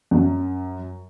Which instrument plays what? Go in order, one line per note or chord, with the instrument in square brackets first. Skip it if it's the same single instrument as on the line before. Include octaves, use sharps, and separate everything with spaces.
[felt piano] F#2